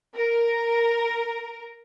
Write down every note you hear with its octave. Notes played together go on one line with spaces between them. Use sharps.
A#4